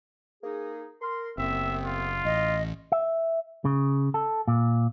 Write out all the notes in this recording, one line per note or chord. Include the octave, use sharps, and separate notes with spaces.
A#3 D#4 G#4
A#4 C6
F#1 C2 B3 C4 E5
F4
A1 D#5
E5
C#3
A4
A#2